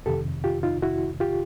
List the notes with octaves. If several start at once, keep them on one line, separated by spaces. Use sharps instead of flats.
F2 C3 D#3 G4 A4
F4 G4
D#4 F4
E4 F#4
F4 G4